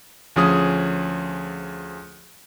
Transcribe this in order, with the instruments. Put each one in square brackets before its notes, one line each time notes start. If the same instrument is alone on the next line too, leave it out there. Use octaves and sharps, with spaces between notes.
[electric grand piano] D2 F3 C#4 G#4 D#6